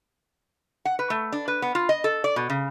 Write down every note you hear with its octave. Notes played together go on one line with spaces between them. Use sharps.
F#5
B4
A3
D4
B4
B3
F4
D#5
A4
D5
B2
C#3